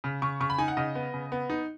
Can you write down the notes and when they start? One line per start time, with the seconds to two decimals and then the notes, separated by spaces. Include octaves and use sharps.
0.04 C#3
0.22 C#3 C#6
0.40 C#3 C#6
0.50 B5
0.58 D#4 G#5
0.68 F#5
0.77 C#3 D#5
0.95 B3
1.14 C#3
1.32 B3
1.50 D#4